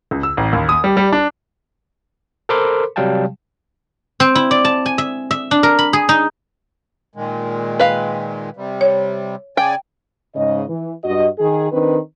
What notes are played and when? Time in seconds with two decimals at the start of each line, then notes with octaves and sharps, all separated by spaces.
0.11 C#2
0.23 E6
0.37 A1
0.53 D#2
0.69 D#6
0.84 G3
0.97 G3
1.13 D4
2.49 A4 A#4 C5 B5 C6 D6
2.96 C3 F#3 G3 F5 G5 A5
4.20 C4
4.35 E4
4.51 D5
4.65 A5
4.86 G#5
4.98 E5
5.31 E5
5.51 D4
5.63 A#4
5.79 B5
5.93 G#4
6.09 D#4
7.15 A#2 D#3 G#3
7.79 B4 F5
8.56 C3 G3
8.81 C#5
9.57 C#3 D5 G5 G#5
10.35 G#2 C#3 D#5
10.67 E3
11.03 G2 F#4 D#5
11.38 D#3 G#4
11.71 D#3 C4 D4 B4